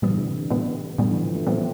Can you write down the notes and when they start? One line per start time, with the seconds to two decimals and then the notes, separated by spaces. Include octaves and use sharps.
0.02 A2 E3 G3 B3
0.10 D3
0.18 C3
0.25 D3
0.50 A2 G3 B3
0.99 A2 D3 G3 B3
1.11 E3
1.23 F3
1.35 A3
1.47 A2 G3 B3 C4